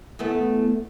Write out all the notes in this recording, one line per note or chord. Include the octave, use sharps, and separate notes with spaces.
E2 A3 B3